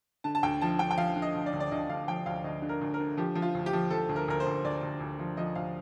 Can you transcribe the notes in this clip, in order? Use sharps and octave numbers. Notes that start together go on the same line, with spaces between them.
D3 A5
A5
D2 G5
F3 A5
D3 G5
G5
F3 F5
D3
D#5
D2
D5
D2
D5
D2 D#5
D2 F5
F3 G5
D2 F5
D2 D#5
D3
A#4
D2
A#4
D3
F3 G4
F3
F4
D2
G4
F3
F3 A4
D2
A#4
D2 A#4
C5
D2
D2 D5
D2
D2
F3
F3 D#5
D2 F5